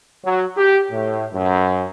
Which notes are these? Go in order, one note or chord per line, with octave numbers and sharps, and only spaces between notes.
F#3
G4
A2
F#2